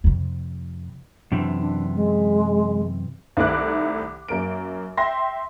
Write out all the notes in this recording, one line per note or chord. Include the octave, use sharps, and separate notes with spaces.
F2 C3
F#2 C3 E3 D4
D4
G#3
C2 D#3 A3 E4 D6 F#6
F#2 A#3 D7
E5 G5 C6 A#6